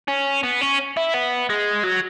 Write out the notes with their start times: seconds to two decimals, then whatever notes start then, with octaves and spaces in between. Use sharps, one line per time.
0.08 C#4
0.43 B3
0.61 C#4
0.97 E4
1.14 B3
1.50 G#3
1.84 F#3